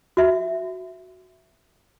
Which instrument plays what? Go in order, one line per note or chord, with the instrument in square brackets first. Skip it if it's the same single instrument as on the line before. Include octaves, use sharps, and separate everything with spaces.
[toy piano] F#4 E5